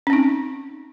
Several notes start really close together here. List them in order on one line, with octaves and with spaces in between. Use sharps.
C#4 C4 D#4